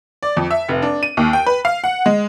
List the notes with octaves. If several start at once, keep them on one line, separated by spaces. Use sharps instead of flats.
D5
F2
E5
F1
D4
D#7
D#2
G5
B4
F5
F#5
G#3